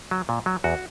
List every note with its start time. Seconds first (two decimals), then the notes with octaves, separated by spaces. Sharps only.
0.11 F#3
0.29 A#2
0.46 F#3
0.64 E2 F#4